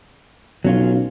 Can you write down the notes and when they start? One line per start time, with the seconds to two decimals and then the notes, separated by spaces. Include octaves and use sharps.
0.64 B1 F#3 C#4 F4